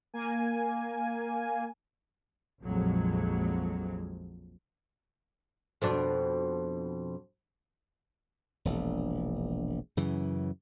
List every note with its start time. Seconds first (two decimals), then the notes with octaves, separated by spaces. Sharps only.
0.13 A#3 G#5
2.63 A#1 F2 F3 F#3 G#3
5.82 F2 B2 D4
8.65 E1 A#1
9.97 F#2 C#3 E3